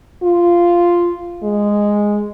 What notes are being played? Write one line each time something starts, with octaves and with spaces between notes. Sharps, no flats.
F4
G#3